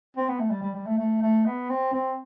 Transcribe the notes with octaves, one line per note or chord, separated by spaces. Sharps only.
C4
B3
A3
G3
G3
G3
A3
A3
A3
B3
C4
C4